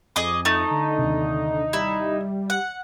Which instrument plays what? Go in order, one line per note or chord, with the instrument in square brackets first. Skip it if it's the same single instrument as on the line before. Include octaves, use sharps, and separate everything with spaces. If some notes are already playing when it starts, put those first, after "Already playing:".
[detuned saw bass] F2 [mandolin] G#4 D#5 D6
[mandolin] A3 [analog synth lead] D#4
[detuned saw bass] D3
[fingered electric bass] D#2 C3
[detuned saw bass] G3 [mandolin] E4
[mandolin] F#5